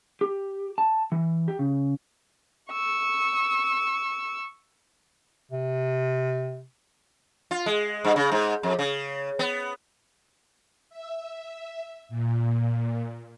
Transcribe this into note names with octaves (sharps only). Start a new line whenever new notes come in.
G4
A5
E3
G4
C#3
C#6 E6
C3
F4
G#3
G2
C#3
G#2
F2
C#3
B3
E5
A#2